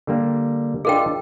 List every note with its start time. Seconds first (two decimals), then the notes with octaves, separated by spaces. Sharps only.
0.07 D3 G3 A#3
0.85 D4 F4 G#4 A#4 D#5 G5